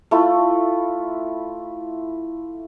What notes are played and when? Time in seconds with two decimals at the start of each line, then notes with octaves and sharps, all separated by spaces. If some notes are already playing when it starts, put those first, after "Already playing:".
0.11 A3 E4 F4